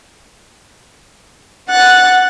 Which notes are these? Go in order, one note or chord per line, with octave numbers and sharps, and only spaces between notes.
F#5 F#6 A6